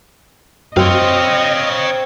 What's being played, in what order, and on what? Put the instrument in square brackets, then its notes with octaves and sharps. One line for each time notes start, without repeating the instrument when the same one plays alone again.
[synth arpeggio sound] F#2 [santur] C4 C5 [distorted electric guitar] C#5 F5 [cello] D#5